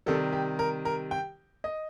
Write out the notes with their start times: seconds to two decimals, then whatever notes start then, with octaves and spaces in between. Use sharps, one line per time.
0.06 C3 D#3 G3 A4
0.33 G4
0.59 A#4
0.85 A#4
1.11 G5
1.64 D#5